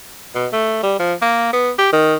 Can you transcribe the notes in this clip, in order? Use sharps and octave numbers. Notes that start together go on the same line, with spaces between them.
B2
A3
G3
F3
A#3
B3
G4
D#3